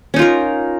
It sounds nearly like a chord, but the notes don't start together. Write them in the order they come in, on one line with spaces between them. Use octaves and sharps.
C#4 D#4 F4 A#4